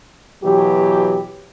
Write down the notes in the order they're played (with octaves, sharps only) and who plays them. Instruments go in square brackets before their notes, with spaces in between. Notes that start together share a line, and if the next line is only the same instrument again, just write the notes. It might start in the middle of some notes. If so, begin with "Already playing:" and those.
[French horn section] B2 E3 F#3 G4